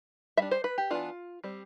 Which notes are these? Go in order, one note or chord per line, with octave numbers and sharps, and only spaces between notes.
G3 D4 E5
C5
B4
G4
E3 B3 D4 F4
G3 C4